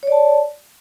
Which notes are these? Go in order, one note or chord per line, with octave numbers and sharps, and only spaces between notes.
C#5 D5 A5